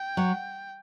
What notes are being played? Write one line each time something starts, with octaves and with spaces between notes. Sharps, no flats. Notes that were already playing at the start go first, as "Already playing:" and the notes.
Already playing: G5
F#3